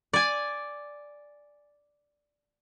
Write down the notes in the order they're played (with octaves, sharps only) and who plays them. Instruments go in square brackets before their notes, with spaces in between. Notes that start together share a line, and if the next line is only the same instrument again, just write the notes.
[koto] D5 G#5